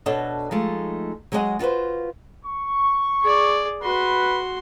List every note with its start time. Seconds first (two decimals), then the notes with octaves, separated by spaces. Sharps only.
0.06 B2 D4 F#4 A4 C#5 D#5
0.51 F3 G#3 A3 D#4
1.32 F#3 G#3 G#4 A#4 D#5 F#5
1.59 F4 F#4 A4 B4 C5
2.45 C#6
3.22 G#4 D5
3.83 F#4 B4 C6